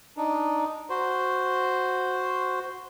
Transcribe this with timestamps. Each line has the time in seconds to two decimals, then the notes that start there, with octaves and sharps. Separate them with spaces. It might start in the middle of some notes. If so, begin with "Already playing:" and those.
0.17 D4 D#4
0.90 F#4 C5